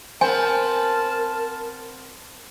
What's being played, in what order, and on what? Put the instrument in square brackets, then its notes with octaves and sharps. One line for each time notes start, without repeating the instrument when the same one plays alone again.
[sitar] B3 C4 C5 [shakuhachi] A#4 [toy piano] G#5 [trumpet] A5